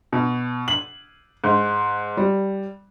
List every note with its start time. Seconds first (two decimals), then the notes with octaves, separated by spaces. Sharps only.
0.13 B2
0.68 F#7
1.44 G#2
2.17 G3